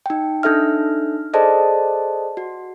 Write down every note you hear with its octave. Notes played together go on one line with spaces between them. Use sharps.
D#4 G5
D4 D#4 A4 E5 F6
G#4 A4 C5 D5 D#5 A5
F#4